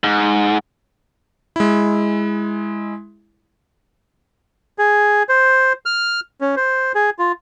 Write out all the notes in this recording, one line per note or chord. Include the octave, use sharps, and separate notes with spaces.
G#2
G#3 E4
G#4
C5
F6
C#4
C5
G#4
F4